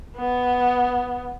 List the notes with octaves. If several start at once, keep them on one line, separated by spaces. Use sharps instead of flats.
B3